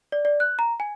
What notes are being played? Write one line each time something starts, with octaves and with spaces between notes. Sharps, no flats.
D5
D5
F#6
A#5
G#5